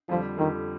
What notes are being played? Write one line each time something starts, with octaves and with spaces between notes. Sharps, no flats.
F2 D3 F3 G3
F2 D3 D#3 G3